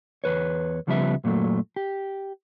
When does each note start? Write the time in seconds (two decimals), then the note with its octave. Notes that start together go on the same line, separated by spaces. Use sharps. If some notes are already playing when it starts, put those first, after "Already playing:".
0.24 E2 B4 C#5
0.87 C#2 C#3 F3 G3 B3 E5
1.24 F#2 A#2 F#3 A3
1.76 G4